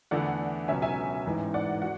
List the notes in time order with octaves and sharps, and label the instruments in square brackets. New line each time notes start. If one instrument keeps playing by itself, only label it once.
[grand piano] E2 D3 A3 E4 [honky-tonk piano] D5 F#5
[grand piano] C#2 B2 F#3 C#4 [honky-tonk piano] E5 G#5
[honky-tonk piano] E5 G#5
[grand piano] A1 G#2 E3
[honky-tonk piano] D5 F#5
[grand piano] F#4 [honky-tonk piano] F#5